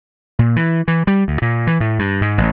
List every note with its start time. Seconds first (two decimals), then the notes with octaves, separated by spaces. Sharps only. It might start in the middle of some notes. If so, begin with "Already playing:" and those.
0.39 A#2
0.56 E3
0.88 E3
1.07 G3
1.28 D2
1.42 A#2
1.67 E3
1.80 A2
1.99 G2
2.21 G#2
2.38 A1